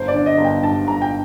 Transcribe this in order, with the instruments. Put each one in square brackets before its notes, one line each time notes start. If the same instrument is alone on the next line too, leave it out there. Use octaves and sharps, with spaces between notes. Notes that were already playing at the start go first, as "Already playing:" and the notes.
Already playing: [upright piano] G1 C5
D5
D3
D#5
G1
G5
G2 A5
G1 A#5
G5